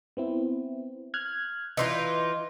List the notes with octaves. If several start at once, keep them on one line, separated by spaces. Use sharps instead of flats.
B3 C4 E4
F6 F#6 G#6
E3 D#4 F4 D#5 C6